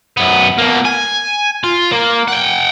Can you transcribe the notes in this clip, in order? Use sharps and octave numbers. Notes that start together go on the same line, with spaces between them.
F#2 B3
B2 A#3
G#5
F4
A#3
F#5 G5